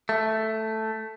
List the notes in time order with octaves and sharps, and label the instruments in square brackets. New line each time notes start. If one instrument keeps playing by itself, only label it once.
[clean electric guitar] A3